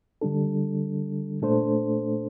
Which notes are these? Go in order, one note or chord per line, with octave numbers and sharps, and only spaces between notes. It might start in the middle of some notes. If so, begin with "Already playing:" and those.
D3 G3 D4 A4
A#2 A3 D4 A4 C5